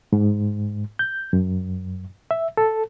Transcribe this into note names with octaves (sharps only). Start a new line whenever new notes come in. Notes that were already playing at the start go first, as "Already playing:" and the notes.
G#2
G6
F#2
E5
A4